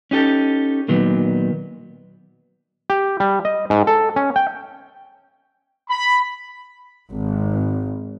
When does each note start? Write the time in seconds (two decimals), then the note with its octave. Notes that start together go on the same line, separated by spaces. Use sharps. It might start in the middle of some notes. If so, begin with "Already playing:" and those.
0.11 C#4 D#4 G4 A4
0.88 A#2 D#3 F#3 B3
2.90 G4
3.20 G3
3.45 D#5
3.70 G#2
3.87 A4
4.16 C#4
4.36 G5
5.89 B5
7.10 G#1